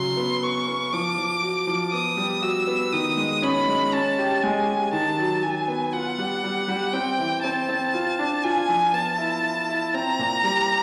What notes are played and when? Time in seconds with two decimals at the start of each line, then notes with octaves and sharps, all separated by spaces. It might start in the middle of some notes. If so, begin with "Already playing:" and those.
Already playing: C#3 F#3 C6
0.17 B3
0.42 B3 C#6
0.68 B3
0.93 F3 D6
1.18 F3
1.42 F#4
1.67 F3
1.93 B3 D#6
2.17 G3
2.42 F#4 E6
2.67 B3
2.92 D#3 D#6
3.17 G#3
3.42 C#4 B5
3.68 G#3
3.92 C#4 A5
4.18 G4
4.43 G#3 G#5
4.68 G4
4.92 D#3 A5
5.18 F#3
5.43 F#3 G#5
5.68 B3
5.93 F4 F#5
6.18 G3
6.43 G3
6.68 G3
6.93 C4 G5
7.18 E3
7.43 C4 A5
7.69 C4
7.93 F4
8.19 D4
8.44 F4 G#5
8.69 F3
8.93 B3 A5
9.18 E4
9.43 E4
9.68 E4
9.94 C4 A#5
10.19 A#2
10.44 G3